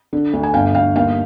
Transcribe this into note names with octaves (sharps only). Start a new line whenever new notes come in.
D3
D2
G#5
G1 F5 G5
G1 F5 G5
D#2 F5 G5